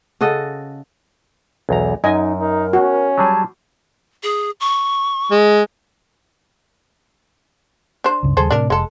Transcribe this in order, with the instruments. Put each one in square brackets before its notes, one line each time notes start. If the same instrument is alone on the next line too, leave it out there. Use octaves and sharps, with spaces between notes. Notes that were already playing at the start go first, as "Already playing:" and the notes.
[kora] C#3 F#4 A4 D#5
[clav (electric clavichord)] B1 E2 A#5
[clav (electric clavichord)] F#2 [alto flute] D#4 [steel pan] D#5 G#5
[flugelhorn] D#4 [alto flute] A#4
[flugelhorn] C#4 [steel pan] F#4
[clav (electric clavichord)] F#3 G3 G#4 [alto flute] A5
[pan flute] G#4
C#6
[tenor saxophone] G#3
[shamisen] D4 C5
[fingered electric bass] C#2 G2 C#3
[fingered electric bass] D#2 C#3 G3 [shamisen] G#4 A4 C5
[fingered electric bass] A2 C3 [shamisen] D4 A#4
[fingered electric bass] F1 [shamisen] G#3 A4